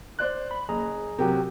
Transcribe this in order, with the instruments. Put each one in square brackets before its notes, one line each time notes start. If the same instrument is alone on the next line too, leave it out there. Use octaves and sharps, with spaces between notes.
[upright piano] C5 D5 F#6
[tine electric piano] B5
[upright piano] F#1 [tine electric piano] G#4 A#5
[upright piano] C3 F#3 [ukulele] F#4 G4 A#4